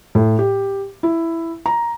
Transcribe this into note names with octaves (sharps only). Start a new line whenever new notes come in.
A2
G4
E4
A#5